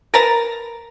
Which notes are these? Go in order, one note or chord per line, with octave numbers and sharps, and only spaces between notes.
A#4 B4 A5 A#5